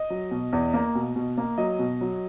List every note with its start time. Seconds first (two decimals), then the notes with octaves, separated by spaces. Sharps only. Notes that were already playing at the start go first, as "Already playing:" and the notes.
Already playing: D#5
0.10 F#3
0.31 B2
0.53 E2
0.74 A#3
0.95 B2
1.16 B2
1.38 A#3
1.58 F#3 D#5
1.79 B2
2.01 F#3